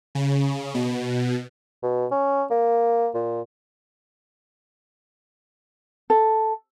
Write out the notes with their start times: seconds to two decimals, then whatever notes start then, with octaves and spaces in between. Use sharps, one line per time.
0.15 C#3
0.74 B2
1.83 B2
2.12 C#4
2.51 A#3
3.15 A#2
6.10 A4